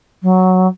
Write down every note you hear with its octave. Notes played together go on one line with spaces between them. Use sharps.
F#3